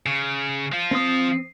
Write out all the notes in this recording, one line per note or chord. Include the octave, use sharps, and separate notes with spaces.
C#3
F3 F4
C4 D#6